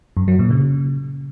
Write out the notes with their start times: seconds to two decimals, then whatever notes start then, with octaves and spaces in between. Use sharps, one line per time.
0.17 F#2
0.28 F#3
0.39 A#2
0.50 C#3